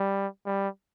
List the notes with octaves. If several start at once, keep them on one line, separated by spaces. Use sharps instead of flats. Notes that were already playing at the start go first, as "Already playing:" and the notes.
Already playing: G3
G3